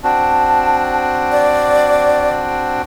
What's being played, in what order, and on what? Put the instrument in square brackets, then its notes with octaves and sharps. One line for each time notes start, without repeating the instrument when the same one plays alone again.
[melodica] C4 D4 F#4 [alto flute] A5
[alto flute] D5